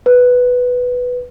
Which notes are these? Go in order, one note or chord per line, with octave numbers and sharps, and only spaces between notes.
B4